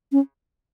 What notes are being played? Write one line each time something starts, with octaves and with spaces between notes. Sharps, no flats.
C#4